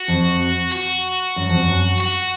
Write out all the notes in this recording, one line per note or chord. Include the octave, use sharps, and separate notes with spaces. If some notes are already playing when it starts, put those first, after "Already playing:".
Already playing: F#4
F2
F#4
F#2
F2
F#2
F#4